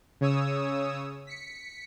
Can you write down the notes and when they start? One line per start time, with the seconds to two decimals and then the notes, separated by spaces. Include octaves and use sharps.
0.21 C#3 C#5 D#6 E6
1.27 B6 C#7